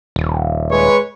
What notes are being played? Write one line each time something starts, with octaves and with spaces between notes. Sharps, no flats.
D#1
G#3 B4 C#5